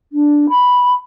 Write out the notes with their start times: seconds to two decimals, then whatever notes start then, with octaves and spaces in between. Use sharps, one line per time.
0.12 D4
0.49 B5